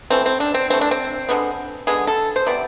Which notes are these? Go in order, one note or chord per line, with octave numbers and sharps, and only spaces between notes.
E3 A3 C4
C4
D4
C4
E3 A3 C4
D4
C4
D3 G#3 B3
D3 G#3 B3 G#4
A4
C5
C3 E3 B3 D5